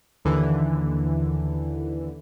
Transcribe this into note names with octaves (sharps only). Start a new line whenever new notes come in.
D#2 D3 E3